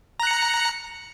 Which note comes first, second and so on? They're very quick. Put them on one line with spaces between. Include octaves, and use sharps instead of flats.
A#5 F#6 C#7